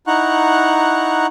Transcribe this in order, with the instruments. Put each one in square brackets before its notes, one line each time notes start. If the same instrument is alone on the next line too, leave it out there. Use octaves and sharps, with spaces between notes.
[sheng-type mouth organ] D#4 E4 F#5 A#5 C#6 F#6